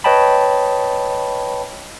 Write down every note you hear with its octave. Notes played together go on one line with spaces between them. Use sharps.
B4 C#5 D#5 G5 A5 B5